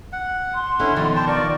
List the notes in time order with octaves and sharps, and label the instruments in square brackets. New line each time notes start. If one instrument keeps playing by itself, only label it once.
[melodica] F#5
[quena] C6
[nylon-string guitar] D3 D4 [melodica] C#4 E4 F#5
[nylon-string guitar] B2 D#3 F3 [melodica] D5
[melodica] G5 A5
[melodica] F4 A#4 C#6 [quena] D5